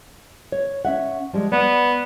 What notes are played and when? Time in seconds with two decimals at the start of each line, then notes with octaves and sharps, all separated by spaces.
0.52 C#5
0.85 C#4 E5 F#5
1.33 F3 G3 G#3
1.52 B3 D5